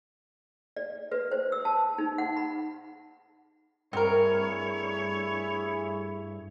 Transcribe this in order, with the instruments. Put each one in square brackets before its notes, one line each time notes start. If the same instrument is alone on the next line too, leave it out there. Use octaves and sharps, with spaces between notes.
[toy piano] D5
B4
C5
E6
A5
D#4
F#5
B5
[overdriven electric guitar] G2 [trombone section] A3 E4 G#4 [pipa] C4 A#4 [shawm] C#5